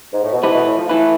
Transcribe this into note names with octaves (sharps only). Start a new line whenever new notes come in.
G#2
A2
B2
C3 A3 E4 B4
B2
A2
F3
E3 A3 E4 B4